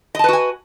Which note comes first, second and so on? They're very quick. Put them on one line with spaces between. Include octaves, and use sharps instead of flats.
D#5 A5 B4 F#4 G#5